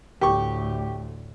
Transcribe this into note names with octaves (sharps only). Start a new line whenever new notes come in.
D2 A2 G4 C#6